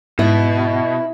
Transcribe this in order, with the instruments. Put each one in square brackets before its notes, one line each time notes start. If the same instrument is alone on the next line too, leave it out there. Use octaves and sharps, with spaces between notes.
[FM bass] G#2 [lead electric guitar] B2 [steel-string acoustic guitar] E4